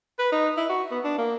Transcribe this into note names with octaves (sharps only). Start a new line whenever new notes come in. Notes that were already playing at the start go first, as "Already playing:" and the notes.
B4
D#4
E4
F#4
B3
D4
A#3